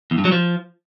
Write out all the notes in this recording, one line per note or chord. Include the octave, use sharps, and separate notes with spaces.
E2
G2
F#3
F3